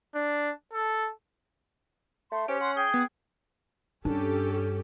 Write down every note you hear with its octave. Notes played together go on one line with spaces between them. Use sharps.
D4
A4
A3 C6
C#4 G4 C5
F#5 C6
G#4 G5 G6
B3
G2 C#4 D4 G4 A4